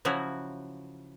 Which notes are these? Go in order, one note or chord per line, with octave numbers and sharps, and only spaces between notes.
C#3 F3 F#3 E4 F#4